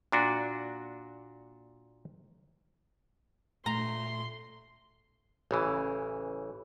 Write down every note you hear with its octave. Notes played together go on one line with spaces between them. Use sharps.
A#2 D4 F#4
A#2 A3 A#5 C6
A1 C#3 E3